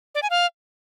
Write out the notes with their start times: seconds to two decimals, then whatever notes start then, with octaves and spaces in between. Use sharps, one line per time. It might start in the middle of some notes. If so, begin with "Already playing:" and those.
0.15 D5
0.23 G#5
0.30 F5